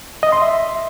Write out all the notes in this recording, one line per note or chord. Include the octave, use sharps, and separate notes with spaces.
D#5
C6
E5